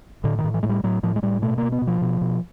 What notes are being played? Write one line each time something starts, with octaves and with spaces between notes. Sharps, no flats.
A2 D3
D#3
A2
E3
A2 G#3
G3
A2 F#3
A2 F3
G#3
A2 G3
B2 A3
B2 A#3
B3
B2
F3
B2
B2